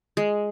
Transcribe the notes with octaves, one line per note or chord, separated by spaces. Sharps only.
G#3